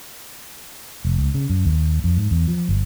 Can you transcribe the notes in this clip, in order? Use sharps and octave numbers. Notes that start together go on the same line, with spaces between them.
F1
C#2
C#3
F#2
D#2
F2
G#2
E2
F3
G1